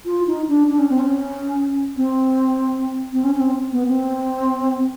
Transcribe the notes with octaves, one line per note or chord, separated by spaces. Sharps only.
F4
D#4
D4
D4
C#4
C4
C#4
C4
C4
C#4
C#4
C4
B3
C4